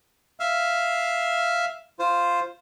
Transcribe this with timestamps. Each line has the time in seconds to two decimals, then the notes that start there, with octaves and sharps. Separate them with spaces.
0.40 E5 F5
1.99 F4 C5